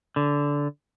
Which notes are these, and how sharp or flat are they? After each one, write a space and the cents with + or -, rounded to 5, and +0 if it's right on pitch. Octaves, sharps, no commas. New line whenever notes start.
D3 -15